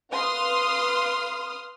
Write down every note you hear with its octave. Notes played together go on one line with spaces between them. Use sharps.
B4 F5 C6 D#6 F6